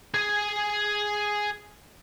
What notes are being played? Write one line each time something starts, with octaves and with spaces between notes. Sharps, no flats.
G#4 G#5